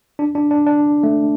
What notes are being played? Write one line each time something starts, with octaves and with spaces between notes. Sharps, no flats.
D4
D4
D4
D4
A3